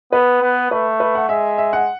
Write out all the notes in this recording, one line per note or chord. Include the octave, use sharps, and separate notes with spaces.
B3 B4
B3
A3 B4
B4
F#5
G#3 E5
E5
F#5